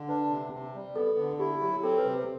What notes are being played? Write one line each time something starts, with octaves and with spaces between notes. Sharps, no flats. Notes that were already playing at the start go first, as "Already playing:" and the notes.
Already playing: D3
D4 B4
C3
C3
G3
B3 A4
D3
E4 G4
F#3 G4
C4 A4
B4
C3
B4